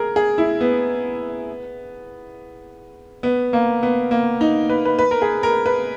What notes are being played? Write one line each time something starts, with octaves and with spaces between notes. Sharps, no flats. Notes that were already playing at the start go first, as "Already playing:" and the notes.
Already playing: G#4 A#4
G#4
E4
B3
B3
A#3
B3
A#3
D#4
B4
B4
B4
A#4
G#4
A#4
B4